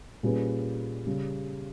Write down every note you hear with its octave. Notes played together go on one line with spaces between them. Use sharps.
A#2 G3 C#4 G#4 B4
C#3 G3